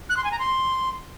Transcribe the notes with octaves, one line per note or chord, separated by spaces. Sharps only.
F#6
C6
G#5
A#5
C6